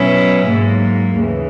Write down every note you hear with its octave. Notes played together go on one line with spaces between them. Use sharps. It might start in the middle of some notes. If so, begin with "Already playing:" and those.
Already playing: B2 F#3 C#4 E4
G#2 F#3 A#3
D#2 C#3 E3